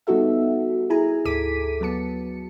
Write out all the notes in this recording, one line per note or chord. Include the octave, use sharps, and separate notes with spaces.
G3 B3 D#4 F#4 A4 E5
E4 G#4 G#5 A#5
D2 G#2 A4 D6 B6 D#7
F#3 B3 A5 C#7